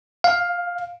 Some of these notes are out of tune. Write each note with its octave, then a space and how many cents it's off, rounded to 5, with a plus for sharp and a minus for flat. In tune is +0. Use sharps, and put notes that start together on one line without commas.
F5 +10